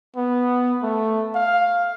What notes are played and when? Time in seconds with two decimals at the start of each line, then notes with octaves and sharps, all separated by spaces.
0.16 B3
0.83 A3
1.35 F5